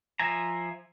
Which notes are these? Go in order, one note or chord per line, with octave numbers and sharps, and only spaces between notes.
F3 E5 G#5 A#5